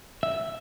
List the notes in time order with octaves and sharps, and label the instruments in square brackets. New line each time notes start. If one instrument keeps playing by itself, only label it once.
[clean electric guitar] E5